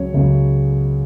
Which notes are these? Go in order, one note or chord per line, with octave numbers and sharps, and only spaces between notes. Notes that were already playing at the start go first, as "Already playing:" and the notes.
Already playing: C#2 C#3 F#3 C#5
C#2 C#3 F#3